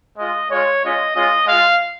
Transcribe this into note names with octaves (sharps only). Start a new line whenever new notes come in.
G#3 F4 D#5
G#3 F4 C#5
G#3 C#4 F4 D#5
G#3 C#4 F4 D#5
G#3 F4 F5